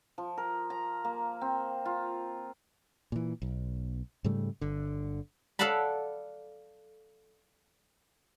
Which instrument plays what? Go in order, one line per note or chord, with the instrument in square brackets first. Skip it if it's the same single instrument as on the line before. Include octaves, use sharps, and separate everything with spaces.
[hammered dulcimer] F3
A#4
A#5
A#3
C4
F4
[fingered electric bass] A#2 E3
B1
G#2 C#3 G3 A3
G1 D3
[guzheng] A4 D5 F5 F#5 A5 B5